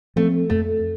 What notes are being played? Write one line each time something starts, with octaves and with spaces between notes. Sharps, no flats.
F3 A3 C4
F2 A3